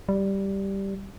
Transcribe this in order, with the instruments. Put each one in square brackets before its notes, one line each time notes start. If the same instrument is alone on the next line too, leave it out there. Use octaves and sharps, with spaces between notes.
[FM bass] G3